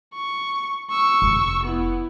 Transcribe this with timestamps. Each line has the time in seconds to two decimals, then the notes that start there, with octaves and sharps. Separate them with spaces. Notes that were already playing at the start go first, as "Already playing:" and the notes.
0.14 C#6
0.90 C#6 E6
1.22 F1
1.63 B3 E4